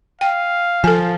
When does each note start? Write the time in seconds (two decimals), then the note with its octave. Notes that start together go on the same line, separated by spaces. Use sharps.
0.21 F5 G5
0.84 F3 A4 G#5